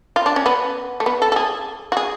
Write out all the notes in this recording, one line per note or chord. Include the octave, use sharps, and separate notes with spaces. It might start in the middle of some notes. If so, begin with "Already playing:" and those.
F4
D4
C#4
B3
A3
B3
A4
A4
G#4
F#4
G#4